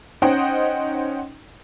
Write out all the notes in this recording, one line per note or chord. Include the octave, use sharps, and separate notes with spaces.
C#4 D#4 C5 D#5 F#5 G5